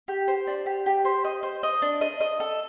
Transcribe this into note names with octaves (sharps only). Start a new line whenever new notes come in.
G4
C5
D4
G4
G4
C5
D#5
C5
D#5
D4
D#5
D#5
A4